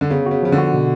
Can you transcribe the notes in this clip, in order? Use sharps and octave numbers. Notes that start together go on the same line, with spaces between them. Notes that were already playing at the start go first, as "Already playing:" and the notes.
D3
C#3 B3
C#3 F#4
C#3 F3
D3
F#4
B2